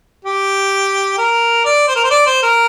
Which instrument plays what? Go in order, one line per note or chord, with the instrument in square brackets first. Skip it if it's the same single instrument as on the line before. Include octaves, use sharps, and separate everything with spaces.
[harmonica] G4
A#4
D5
C5
A#4
C5
D5
C5
A#4